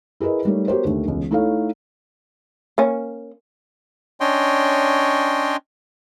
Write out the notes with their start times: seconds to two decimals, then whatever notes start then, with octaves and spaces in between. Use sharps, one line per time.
0.20 E4 G#4 A#4 B4 D#5
0.45 G3 A3 D#4 A#4 C#5
0.67 B3 F#4 G4 A#4 C5 C#5
0.84 D#2 D3 A3
1.05 E1 C#2
1.31 A3 D#4 E4 A4 C#5 F5
2.78 A#3 C#4
4.21 C#4 D4 C#5 D#5 G5 C6